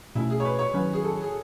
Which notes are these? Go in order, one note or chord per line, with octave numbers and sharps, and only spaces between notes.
B2 A3 C#4 E4
G#4
C#5
B4
C#5
D#3 F#3 C#4 B4
G#4
A4
G#4